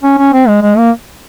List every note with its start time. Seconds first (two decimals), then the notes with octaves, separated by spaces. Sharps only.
0.04 C#4
0.18 C#4
0.33 C4
0.48 G#3
0.62 G#3
0.77 A#3